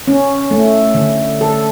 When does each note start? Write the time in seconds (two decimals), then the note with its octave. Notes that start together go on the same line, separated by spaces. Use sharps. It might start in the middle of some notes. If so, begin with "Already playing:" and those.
0.08 C#4
0.51 A3
0.94 D3
1.41 A4